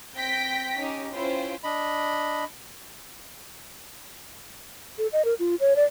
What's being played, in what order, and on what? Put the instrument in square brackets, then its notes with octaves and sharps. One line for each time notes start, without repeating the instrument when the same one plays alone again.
[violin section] C4 G5 G6 A#6 B6 D7
C#4 D#4 G4
C#4 E4 F4 C5 G5
[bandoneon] D4 D#5 B5
[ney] A4
D#5
A#4
F4
C#5
D5